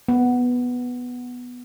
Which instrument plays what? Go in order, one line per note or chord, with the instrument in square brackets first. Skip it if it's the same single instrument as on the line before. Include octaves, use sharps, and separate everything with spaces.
[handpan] B3